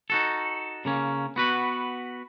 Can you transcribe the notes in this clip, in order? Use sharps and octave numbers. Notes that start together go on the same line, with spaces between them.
D#4 F#4 A4
C#3 A#3 C#4
B3 F#4 B4